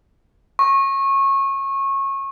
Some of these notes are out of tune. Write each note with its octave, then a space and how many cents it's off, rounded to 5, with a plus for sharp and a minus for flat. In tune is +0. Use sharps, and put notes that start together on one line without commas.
C#6 -25